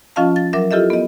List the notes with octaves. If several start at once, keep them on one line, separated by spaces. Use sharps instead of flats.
F3 C#4 F4 D#5 F5 A5
A6
F#3 A#4 E5 D6
E4 F4 G4 A4 D#5 E5
B3 D#5